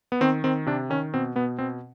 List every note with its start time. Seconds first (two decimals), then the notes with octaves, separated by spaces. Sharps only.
0.12 B3
0.21 D#3 C4
0.44 D#3 C4
0.66 C3 D4
0.90 D#3 C#4
1.14 B2 C4
1.35 B2 B3
1.59 B2 C4